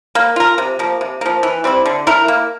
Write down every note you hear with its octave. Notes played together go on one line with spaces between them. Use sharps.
A#3
F4 A#4
C3
F3 A#3
C3
F3 A#3
E3
G3 C4 E4
D3
A3 E4 A#4
A#3